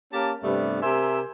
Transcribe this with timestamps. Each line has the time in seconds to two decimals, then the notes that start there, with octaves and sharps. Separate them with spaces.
0.13 A#3 C#4 G4 A5
0.43 G2 C3 G3 A3 B3
0.82 C3 A#4 C5 E5 G#5